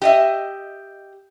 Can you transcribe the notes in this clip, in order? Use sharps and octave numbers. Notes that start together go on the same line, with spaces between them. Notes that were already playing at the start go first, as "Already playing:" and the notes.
G4 D#5 E5